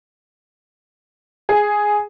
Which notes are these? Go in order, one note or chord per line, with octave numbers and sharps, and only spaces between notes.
G#4